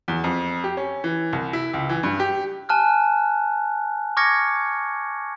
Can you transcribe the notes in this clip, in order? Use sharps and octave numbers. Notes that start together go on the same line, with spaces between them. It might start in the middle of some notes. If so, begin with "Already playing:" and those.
E2
F2
G4
C#4
E3
C2
E4
C#2
E3
G2
G4
G#5 A5 F6 F#6
C#6 D6 F6 G#6 A#6 C#7